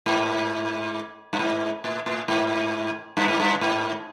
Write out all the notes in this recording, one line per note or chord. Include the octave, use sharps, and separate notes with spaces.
G#2
G2
G#2
A2
A2
G#2
G2
G#2
G2
G#2